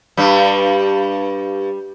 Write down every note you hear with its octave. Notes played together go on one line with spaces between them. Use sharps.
G2 G3